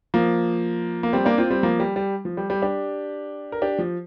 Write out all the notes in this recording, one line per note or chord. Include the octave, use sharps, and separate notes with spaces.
F3 A#3
A#3
G3 C4
A#3 D4
C4 F4
G3 C4
F3 A#3
G3
G3
F3
G3
G3
D4 G4
A#4
D4 G4
F3